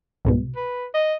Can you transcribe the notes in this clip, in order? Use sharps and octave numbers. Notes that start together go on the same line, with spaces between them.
C2 G#2 B2
B4
D#5